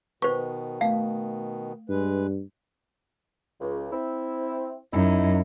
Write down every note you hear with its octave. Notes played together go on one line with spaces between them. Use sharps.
B2 D#3 B4 C5 C#6
A3 F5
G2 G#3 B4
C#2
C4 E4
F#2 D#4 E4